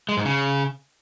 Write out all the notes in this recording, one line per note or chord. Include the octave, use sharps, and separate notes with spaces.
G#3
G#2
C#3